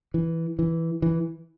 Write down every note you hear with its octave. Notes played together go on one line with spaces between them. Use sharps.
E3
E3
E3